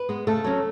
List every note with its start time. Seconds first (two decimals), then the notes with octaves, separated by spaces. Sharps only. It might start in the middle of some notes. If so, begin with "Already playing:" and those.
Already playing: B4
0.09 G#3 B3
0.27 C#3 A3 A4
0.44 F#3 C#4